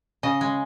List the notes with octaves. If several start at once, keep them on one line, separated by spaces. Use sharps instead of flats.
C#3 D#5
G#3